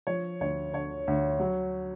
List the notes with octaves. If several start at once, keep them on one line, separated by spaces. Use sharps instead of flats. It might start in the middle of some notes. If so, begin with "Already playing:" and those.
F3 C#5
D2 C#5
D3 C#5
D2
F#3